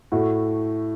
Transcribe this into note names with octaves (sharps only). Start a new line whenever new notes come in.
A2 A3 F#4